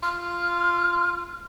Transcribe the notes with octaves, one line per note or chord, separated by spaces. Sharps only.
F4 F6